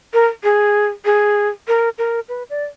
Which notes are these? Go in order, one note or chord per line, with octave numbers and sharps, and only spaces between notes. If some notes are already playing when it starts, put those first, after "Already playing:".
A#4
G#4
G#4
A#4
A#4
B4
D5